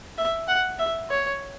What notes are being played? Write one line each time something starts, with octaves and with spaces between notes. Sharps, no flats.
E5
F#5
E5
C#5